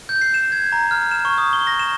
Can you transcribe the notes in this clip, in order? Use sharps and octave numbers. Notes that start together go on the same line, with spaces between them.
G6
C7
E7
G#6
A#5
F6
E7
C#6
D#6
G7
A#6
E7